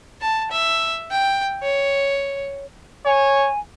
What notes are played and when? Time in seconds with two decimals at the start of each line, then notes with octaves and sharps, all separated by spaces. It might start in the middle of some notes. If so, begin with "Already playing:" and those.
0.21 A5
0.51 E5
1.11 G5
1.63 C#5
3.05 C#5 G#5